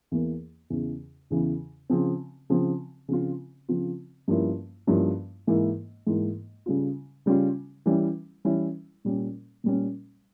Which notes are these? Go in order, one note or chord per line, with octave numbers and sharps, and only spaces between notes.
E2 E3 A#3
E2 C#3 E3
E2 C#3 E3
C#3 F3 C4
C#3 F3 C4
C#3 F3 C4 F4
C#3 F3 C4 F4
G2 F3 A#3 C#4 E4
G2 F3 A#3 C#4 E4
G#2 E3 A#3 E4
G#2 E3 A#3 E4
C#3 G3 C#4 F4
C#3 G3 C#4 F4
E3 G3 C#4 E4
E3 G3 C#4 E4
A#2 G3 C#4
A#2 G3 C#4